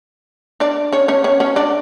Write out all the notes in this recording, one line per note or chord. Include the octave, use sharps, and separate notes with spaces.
D4 D5
C#4 C#5
C#4 C#5
C#4 C#5
C#4 C#5
D4 D5